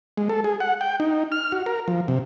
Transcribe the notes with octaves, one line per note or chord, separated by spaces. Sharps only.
G#3
A4
G#4
F#5
G5
D#4
F6
F#4
A#4
F3
C3